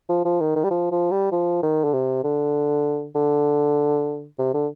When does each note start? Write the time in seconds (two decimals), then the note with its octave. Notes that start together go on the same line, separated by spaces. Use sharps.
0.09 F3
0.25 F3
0.41 D#3
0.56 D#3
0.64 G3
0.71 F3
0.92 F3
1.11 G3
1.32 F3
1.63 D#3
1.84 D3
1.93 C3
2.24 D3
3.15 D3
4.38 C3
4.54 D3